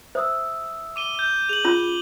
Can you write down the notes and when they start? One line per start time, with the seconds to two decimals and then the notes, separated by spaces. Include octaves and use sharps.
0.15 C5 E5 D#6 E6
0.96 D6 D#7 G7
1.19 G6
1.49 G#4 F7 F#7
1.64 C#4 F4 B5